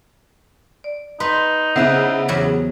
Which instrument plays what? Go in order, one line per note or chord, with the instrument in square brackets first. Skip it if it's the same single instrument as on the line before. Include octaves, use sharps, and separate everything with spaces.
[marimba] D5
[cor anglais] D#4 [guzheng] B4 [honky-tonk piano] C6
[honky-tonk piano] C#3 B3 E4 [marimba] C5 E5 F#6
[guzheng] E2 F#3 G4